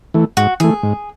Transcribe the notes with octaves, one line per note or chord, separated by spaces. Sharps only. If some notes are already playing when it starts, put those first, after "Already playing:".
E3 A3
G#2 F#4
E3 A3 G#4
G#2